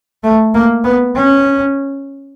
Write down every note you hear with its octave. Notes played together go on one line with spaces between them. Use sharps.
A3
A#3
B3
C#4